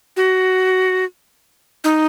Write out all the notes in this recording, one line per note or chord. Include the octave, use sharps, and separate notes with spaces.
F#4
D#4